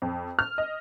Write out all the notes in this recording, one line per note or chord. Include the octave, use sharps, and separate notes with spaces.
F2
F6
D#5